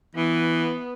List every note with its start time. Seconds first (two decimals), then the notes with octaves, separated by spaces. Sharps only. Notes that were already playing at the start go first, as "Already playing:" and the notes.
0.15 E3 B3